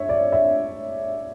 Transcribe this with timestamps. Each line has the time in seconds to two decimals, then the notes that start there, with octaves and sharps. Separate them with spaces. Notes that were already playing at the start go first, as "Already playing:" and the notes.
Already playing: C#5 E5
0.09 D5
0.32 E5